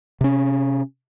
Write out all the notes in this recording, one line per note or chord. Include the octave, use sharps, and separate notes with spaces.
C3 C#4